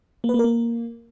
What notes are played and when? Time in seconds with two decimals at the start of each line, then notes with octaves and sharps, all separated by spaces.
0.24 A#3
0.29 B4
0.34 A#3
0.39 A#4
0.44 A#3